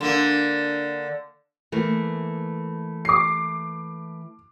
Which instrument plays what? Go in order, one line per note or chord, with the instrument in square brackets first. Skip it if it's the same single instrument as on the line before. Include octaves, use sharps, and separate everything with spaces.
[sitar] D3 A#3
[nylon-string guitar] E3 A3 A#3
[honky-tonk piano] D6 C7